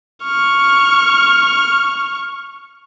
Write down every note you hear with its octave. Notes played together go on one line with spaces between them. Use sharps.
C#6 F6